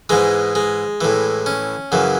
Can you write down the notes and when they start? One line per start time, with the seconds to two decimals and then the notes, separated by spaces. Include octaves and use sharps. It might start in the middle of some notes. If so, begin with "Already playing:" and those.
0.09 G#2 E3 G#3
0.55 G#3
1.01 A2 E3
1.46 C#4
1.92 F#2 C#3 E3